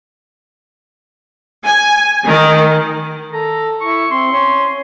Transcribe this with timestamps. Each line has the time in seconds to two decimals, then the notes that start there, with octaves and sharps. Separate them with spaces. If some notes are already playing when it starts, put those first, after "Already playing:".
1.64 G#5
2.26 D#3
3.33 A4 A#5
3.81 E4 C#6
4.11 C4 C6
4.32 C#4